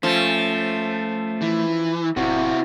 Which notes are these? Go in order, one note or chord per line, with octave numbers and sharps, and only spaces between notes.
F3 A3 C#4
E3
D1 C3 E4 F#4